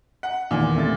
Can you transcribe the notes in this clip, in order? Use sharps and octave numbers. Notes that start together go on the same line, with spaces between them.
F#5
E2 A#2 D#3
D2 C3 A6